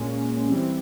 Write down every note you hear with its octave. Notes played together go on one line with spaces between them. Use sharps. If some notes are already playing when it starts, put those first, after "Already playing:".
Already playing: A#2 G#3 C#4
E3 G3 C4